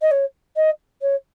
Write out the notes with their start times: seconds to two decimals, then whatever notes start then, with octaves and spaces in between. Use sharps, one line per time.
0.02 D#5
0.11 C#5
0.56 D#5
1.02 C#5